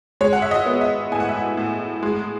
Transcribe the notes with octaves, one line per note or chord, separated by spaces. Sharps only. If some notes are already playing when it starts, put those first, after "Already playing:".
G#3 C#5
F#5
E5
D#5
B3
E5
A2 G#5
F#5
E5
F#5
A2
G#3